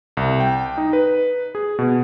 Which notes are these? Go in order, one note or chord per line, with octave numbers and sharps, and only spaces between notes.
C2
G5
D#4
B4
G#4
B2